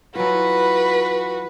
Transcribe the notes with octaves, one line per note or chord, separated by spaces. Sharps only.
E3 F#3 F4 F#4 B4